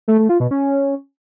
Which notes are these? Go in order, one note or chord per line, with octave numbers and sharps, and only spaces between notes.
A3
A3
F4
B2
C#4